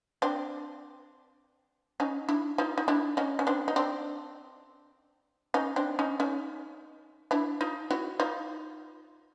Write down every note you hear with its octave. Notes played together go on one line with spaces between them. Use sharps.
C4 D4
C#4 D#4
D4 E4
D#4 F4
D#4
D4 E4
C#4 D#4
C#4
C4 D4
D#4
C4 D4
C#4 D#4
C4 D4
C#4 D#4
C#4 D#4
D4 E4
D#4 F4
E4 F#4
D#4 F4